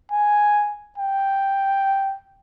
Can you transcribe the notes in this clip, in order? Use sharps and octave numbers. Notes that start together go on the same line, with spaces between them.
G#5
G5